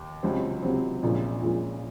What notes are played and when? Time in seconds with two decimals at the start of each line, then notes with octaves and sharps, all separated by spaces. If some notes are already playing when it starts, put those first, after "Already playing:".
Already playing: D#2
0.23 C#2 C3 F#3 C4
0.62 C#2 C3 F#3 C4
1.03 A#1 A#2 G#3 C#4 F4
1.42 A#1 A#2 G#3 C#4 F4